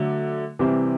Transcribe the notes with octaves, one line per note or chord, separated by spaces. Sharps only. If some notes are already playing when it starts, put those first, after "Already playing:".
Already playing: D3 F#3 A3
C3 E3 G3 C4